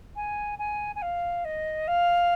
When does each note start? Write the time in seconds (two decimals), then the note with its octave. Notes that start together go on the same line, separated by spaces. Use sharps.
0.16 G#5
0.58 G#5
0.95 G#5
1.02 F5
1.44 D#5
1.87 F5